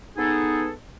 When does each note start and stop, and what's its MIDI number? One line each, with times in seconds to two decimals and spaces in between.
0.17 0.68 59
0.17 0.68 63
0.17 0.68 68
0.17 0.68 69